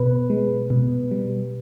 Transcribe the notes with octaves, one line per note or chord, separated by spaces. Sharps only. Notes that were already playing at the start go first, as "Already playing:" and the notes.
Already playing: B2 B4
G#3
B2
G3